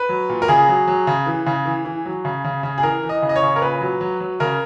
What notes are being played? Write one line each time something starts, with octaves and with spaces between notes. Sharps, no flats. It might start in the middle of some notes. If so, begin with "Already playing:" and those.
Already playing: B4
F#3
A#2
A#4
C#3 G#4
F#3
F#3
C#3
E3
C#3
E3
E3
F#3
C#3
C#3
C#3
G#4
E3 A#4
E3
D#5
C#3
D#5
C#5
C#3
A#4
A#2 B4
F#3
F#3
F#3
C#3 A#4